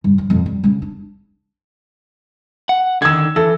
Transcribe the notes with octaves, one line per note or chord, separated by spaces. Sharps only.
G2 C#3
G2 F#3
F2 C3
G3
C#3 C#4
D4
F#5
D3 D#3 E6 G#6
E3 A4